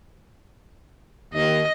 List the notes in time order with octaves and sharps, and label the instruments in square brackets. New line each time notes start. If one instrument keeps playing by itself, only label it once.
[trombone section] D#2 [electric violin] D#5